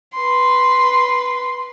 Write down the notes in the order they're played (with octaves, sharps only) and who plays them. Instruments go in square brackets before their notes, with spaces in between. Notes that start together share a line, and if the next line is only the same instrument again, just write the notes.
[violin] B4 C6